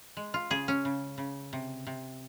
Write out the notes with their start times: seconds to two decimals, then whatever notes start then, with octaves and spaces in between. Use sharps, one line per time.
0.17 G#3
0.34 F4
0.50 C#3 G#4
0.68 C#4
0.85 C#3
1.18 C#3
1.53 C3
1.87 C3